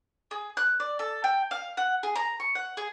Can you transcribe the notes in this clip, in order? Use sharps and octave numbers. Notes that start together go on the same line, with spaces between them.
G#4
F#6
D5
A4
G5
F5
F#5
G#4
A#5
C#6
F#5
G#4